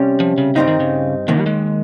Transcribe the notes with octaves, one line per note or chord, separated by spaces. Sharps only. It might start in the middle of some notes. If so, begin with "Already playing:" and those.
Already playing: C3 G3 C#4
F3
C#3
G2 C#3 G3 C4 D#4
D#3
C#3
D#2 C3 D#3 A#3
G3
G#3